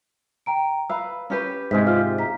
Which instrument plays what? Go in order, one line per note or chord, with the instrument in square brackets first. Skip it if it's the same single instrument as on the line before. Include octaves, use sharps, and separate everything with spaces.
[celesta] G5 A#5 D7
[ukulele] B4 F5 A#5 [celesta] B5 E6
[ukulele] C#4 G4 B4
[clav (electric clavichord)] G#2 C3 G#3 [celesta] B6
[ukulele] F4 G4 [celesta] F5 F6
[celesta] A#5 B6